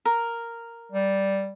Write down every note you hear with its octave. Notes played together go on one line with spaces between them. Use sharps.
A#4
G3